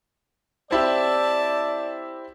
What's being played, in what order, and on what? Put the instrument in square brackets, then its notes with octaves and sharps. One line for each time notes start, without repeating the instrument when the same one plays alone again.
[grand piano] C4 E4 G4 [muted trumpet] D5 [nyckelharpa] A5